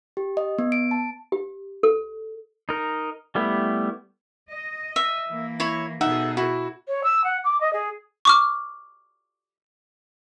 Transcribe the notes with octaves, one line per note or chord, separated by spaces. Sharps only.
G4
D#5
B3
D7
A5
G4
A4
D#4 A#4
G3 A3 B3 E4 G4
D#5
E5
E3 A#3
E4 C#5
B2 D#4 G#4 A4 E5 F#5
E4 F#4
C#5
E6
F#5
D6
D#5
G#4
C#6 D6 F6